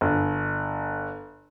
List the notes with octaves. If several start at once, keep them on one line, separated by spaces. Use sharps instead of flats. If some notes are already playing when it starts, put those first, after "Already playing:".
G1